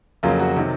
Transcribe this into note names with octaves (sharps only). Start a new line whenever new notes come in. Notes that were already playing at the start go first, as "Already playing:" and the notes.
F2 C#3 F#3 A#3 F4
F#4
C3 D#3 F#3